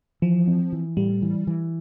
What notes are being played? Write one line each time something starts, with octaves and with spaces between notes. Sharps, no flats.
E3 F3
C4
E3
A2 G3
E3
E3